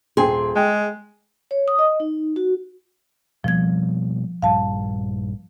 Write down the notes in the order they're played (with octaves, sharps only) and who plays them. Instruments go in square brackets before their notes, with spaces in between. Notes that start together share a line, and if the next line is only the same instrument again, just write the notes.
[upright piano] D#1 G5 C6 [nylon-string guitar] G#4
[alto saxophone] G#3 [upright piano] G5
[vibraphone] C#5
D#6
D#5
D#4
F#4
[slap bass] B2 G3 A#3 [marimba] F3 G#6
[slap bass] A#1 G2 [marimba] F5 A5